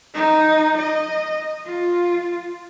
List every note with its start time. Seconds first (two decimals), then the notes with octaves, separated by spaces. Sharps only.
0.14 D#4
0.77 D#5
1.66 F4